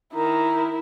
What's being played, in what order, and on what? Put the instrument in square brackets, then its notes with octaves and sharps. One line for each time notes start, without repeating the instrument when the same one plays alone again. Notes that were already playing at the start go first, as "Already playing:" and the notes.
[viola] D#3 [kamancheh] E4 [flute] A#5